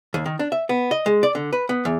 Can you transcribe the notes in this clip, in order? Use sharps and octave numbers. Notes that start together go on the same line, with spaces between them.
D#2
D#3
D4
E5
B3
D#5
G#3
D5
D3
B4
B3
E2